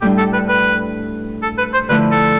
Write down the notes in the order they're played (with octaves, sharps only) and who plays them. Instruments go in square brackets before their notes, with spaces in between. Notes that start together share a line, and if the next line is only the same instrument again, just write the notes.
[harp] A2 G3 D4 [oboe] G4
[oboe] A4
B4
B4
A4
B4
C5
[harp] D3 F3 A3 E4 [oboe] B4
[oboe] A4